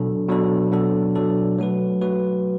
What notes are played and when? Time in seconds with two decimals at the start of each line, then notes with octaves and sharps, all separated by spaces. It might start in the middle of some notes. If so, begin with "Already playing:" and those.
Already playing: B2 F#3 D4 A4
0.28 B2 F#3 D4 A4
0.71 B2 F#3 D4 A4
1.15 B2 F#3 D4 A4
1.59 F#3 A3 F#4 B4
2.01 F#3 A3 F#4 B4